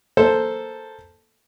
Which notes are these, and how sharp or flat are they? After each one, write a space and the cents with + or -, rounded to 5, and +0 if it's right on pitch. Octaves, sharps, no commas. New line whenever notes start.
A#3 +0 A4 +0 C5 +0